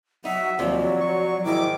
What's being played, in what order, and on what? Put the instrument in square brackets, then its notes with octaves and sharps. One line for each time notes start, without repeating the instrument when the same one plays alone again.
[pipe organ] F#3 [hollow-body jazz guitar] D#4 [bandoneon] E5 [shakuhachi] F#5
[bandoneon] D#2 [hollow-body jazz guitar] C3 F3 [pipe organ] F#3 [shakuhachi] D5
[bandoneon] C#6
[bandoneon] G#2 D#3 [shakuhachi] E4 [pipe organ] D6